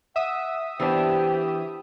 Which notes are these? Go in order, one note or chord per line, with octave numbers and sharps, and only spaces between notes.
E5 F#5 D#6
E3 B3 D4 G4 C5